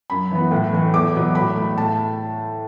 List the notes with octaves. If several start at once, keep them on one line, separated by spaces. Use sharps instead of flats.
F#2 B5
E3 B3
A2
E3 A3
E2 D6
B2 F#3 B3
A2 B5
A3
A2 A5